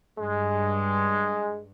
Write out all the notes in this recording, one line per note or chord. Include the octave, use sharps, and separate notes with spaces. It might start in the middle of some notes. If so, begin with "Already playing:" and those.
G2 G#3